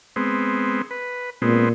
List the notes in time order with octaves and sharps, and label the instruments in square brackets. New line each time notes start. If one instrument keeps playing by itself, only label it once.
[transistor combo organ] G#3 B3 C4
B4
[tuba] A#2 [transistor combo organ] G#3 B3 C4